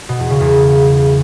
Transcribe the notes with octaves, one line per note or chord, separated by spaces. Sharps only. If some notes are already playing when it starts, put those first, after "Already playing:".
B2
E2
C#3
E2